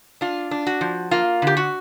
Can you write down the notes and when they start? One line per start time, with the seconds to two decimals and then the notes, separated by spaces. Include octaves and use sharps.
0.21 D4 F4
0.51 D4
0.67 F#4
0.81 F3
1.11 A#3 F4
1.42 D3 G4
1.57 F#4